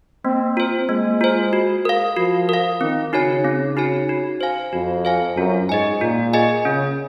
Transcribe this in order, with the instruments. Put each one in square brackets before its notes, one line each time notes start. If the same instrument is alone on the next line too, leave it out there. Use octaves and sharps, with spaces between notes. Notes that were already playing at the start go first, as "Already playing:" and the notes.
[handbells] A#3 [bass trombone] C4
[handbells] F4 C5
[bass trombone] G#3 [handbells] A#3
[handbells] F4 C5
F#4
A#4 F5
[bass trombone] F3 [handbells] F#4
[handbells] A#4 F5
[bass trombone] D#3 [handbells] C4
[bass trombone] C#3 [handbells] D#4 F#4 C#5 G#5
[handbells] C4
D#4 F#4 C#5 G#5
F#4
C5 F5 G#5
[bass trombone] F2 [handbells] F#4
[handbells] C5 F5 G#5
[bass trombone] F#2 [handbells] F4
[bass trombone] G#2 [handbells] G#4 D#5 G#5
[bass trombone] A#2 [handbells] F4
[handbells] G#4 D#5 G#5
[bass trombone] C#3 [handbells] C#4